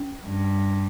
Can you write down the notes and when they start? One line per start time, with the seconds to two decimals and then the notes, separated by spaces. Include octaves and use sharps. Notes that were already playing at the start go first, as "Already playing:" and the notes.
Already playing: C#4
0.25 G2